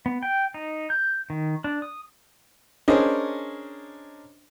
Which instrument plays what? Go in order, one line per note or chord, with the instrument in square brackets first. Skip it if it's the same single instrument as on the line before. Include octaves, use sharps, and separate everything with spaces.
[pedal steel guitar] B3
G5
D#4
G6
D#3
D4
D#6
[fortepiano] C#4 D4 G#4 A#4 C5 D#5